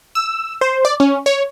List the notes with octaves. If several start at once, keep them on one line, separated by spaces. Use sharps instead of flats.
E6
C5
D5
C#4
C#5